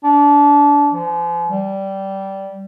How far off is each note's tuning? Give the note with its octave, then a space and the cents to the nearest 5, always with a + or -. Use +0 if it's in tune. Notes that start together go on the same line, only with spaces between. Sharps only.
D4 -25
F3 -40
G3 -15